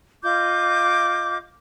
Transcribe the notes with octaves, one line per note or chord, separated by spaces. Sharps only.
F4 D#5 D6 G6